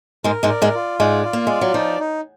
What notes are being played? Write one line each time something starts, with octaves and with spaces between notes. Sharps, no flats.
G#2 G#3 A#4
G#2 G#3
D5
G#2 G#3
F4
G#2 G#3 D5
F4
A#3
G#3 D5
F#3
F3 D#4
D#4